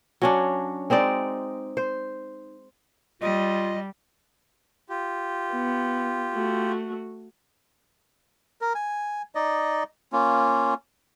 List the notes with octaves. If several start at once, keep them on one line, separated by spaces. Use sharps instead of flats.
F#3 C#4 D4
G#3 C4 D#4 D5
C5
G3 F4 D#5
F4 G4
B3
A3 F#4
A#4
G#5
D#4 D5 D#5
A#3 C#4 F4